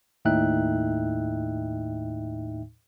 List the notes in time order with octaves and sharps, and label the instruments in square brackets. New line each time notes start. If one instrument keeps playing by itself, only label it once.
[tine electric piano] D#2 A2 D#4 E5 G5 F#6